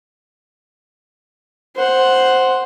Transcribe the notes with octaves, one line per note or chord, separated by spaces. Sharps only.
C5 F#5